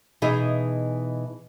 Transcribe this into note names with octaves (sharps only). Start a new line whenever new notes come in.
B2 E3 D#4 G#4 D#5 E5